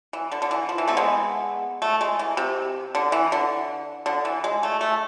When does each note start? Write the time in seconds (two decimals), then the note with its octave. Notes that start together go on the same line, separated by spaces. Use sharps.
0.13 E3
0.32 D3
0.42 D3
0.51 E3
0.69 F3
0.78 E3
0.87 A3 C4
0.97 G#3 B3
1.82 A3
2.01 G#3
2.19 E3
2.37 C3
2.95 D3
3.12 E3
3.32 D3
4.06 D3
4.25 E3
4.44 G#3
4.63 A3
4.81 A3